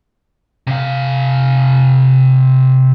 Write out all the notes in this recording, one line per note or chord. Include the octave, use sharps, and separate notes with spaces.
C3 F5